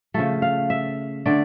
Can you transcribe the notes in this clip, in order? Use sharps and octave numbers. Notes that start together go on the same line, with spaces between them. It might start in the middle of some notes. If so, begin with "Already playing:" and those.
C#3 F3 A3 A4
F5
E5
D3 A3 D5